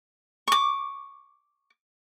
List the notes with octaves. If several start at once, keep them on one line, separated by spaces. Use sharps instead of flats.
C#6 D6